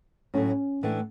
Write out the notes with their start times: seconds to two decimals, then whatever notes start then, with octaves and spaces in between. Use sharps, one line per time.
0.34 A2 F#3 A3 C#4
0.83 A2 E3 A3 D4